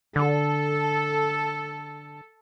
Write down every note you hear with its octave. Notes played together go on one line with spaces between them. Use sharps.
D3 A4